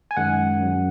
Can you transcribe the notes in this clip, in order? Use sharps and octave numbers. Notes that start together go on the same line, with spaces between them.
G#5
F#2 D#3 G#3 F#5
F#2 F#3